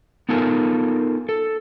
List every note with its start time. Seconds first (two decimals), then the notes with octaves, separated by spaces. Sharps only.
0.29 B3 D#4 F4 A4 A#4 G#5
1.29 A4